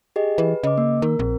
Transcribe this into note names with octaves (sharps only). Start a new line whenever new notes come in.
G4 G#4 D#5
E3 B4
C#3 D#5 D6
A#3
D#3 A#4
A#1 C4